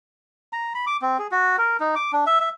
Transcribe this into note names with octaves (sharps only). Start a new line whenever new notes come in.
A#5
B5
D6
C4
G#4
F#4
A#4
D#4
D6
D4
E5
E5